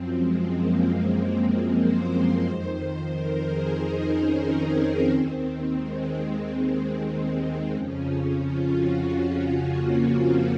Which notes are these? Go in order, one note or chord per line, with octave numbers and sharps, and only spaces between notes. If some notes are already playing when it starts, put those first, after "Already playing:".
Already playing: F#2 F3 C4
G#3
A#3
C5
F2 D#3 C5
A#4
G#4
D#4
C#4
C4
D#2 D#3 C4
G#3
F2 C#3 F3 C#4
F4
F#4
F4
A#3
C4